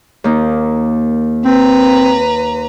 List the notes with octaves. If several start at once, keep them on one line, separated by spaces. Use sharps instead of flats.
D#2 A#3 D#4
C4 B4 A#5